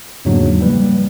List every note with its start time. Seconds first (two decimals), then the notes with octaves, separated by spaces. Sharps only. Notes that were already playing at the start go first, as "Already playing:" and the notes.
0.25 E2 G#2 C#3 F#3 A#3 D4
0.60 F3 G3 A#3 B4